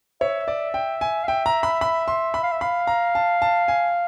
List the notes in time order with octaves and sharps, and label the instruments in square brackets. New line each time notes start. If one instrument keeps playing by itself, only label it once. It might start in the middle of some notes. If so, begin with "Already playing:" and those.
[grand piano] C#5 [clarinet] E5
[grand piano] D5
G5
G#5
[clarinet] F5
[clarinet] E5 [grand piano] G5
[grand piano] A#5
B5
B5
C6
B5
[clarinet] F5
E5
[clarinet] F5 [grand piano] B5
[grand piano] A#5
A5
A5
G#5